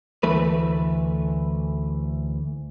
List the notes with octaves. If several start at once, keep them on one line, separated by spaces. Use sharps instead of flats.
D2 E3 A3 B4